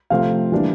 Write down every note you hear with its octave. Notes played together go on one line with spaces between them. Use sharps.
C3 F3 A3 C4 F5
E3 G3 A#3 D4